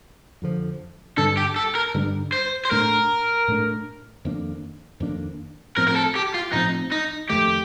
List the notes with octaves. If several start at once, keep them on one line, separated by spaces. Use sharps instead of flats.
F2 D3 F3
G2 D3 G3 D4 A4
G4
A4
A#4
G2 D3 G3 D4
C5
C5
A2 A3 D4 A#4
A2 A3 D4
F2 D#3 A#3 D4
F2 D#3 A#3 D4
A2 F3 C4 A#4
A#4
A4
G4
F4
A2 F3 C4 D#4
D#4
F2 D#3 A3 G4